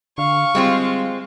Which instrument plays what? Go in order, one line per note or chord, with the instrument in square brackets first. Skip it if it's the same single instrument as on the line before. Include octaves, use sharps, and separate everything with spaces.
[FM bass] D3 [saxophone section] F5 [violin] C#6
[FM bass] G3 [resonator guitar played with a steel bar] G#3 C4 F4